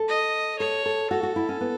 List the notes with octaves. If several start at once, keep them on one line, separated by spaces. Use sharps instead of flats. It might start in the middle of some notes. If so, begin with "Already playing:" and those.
Already playing: A4
D#5
A4 C#5
A4
F#4 A4
F#4
E4
C#4
B3